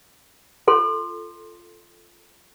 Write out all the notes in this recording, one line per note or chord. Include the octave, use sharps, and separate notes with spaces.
F4 A4 C6